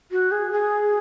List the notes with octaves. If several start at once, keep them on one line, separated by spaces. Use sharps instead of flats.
F#4
G#4
G#4